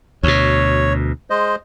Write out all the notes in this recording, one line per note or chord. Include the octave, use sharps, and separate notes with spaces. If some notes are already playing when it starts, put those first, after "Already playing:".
D2 B2 C#5
G#3 C5 D#5